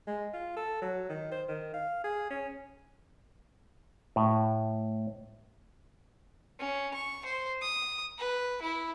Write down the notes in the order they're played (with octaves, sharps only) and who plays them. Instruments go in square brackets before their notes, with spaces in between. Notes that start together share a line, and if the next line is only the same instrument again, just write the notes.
[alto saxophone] G#3
F4
A4
F#3
D#3
C5
D#3
F5
G#4
C#4
[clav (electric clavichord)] A2
[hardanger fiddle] C#4
C#6
C5
D#6
B4
E4